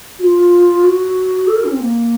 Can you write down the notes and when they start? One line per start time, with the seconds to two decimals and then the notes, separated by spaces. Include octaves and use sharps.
0.19 F#4
0.23 F4
0.84 F#4
1.47 A4
1.56 A#4
1.64 C#4
1.72 C4
1.80 A#3